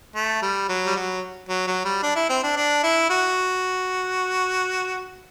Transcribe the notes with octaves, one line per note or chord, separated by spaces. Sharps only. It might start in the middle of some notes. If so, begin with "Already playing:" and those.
A3
G3
F#3
G3
F#3
F#3
F#3
G3
D4
E4
C4
D4
D4
E4
F#4